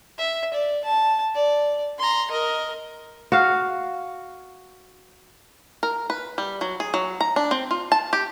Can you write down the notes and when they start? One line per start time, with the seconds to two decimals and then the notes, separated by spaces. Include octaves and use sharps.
0.18 E5
0.54 D5
0.84 A5
1.35 D5
1.99 A#5 C6
2.31 A#4 D#5
3.32 F#4 F5
5.83 A#4
6.10 B4
6.38 G3
6.61 F#3
6.80 G#4
6.94 F#3
7.21 A#5
7.36 D4
7.51 C4
7.71 F4
7.92 A5
8.13 G4